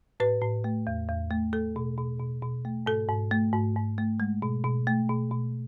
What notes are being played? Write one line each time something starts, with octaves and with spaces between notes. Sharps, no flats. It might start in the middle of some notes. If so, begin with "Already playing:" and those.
A2 B4
A2
A3
E2
E2
A3
A3 A4
B2
B2
B2
B2
A3
G#2 A4
G#2
A3
G#2
G#2
A3
G#3
B2
B2
A3
B2
B2